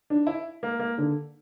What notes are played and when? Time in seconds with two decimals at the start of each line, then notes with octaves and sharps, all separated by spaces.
0.10 D4
0.27 E4
0.63 A#3
0.79 A#3
0.98 D3